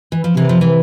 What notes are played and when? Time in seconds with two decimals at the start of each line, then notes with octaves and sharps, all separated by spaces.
0.12 E3
0.24 F3
0.36 C3 E3
0.49 F3
0.61 E3